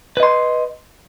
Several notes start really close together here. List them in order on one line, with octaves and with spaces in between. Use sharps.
B4 D#5 C6